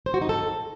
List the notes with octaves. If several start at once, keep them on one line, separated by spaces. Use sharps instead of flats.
C5
F#4
D#4
A4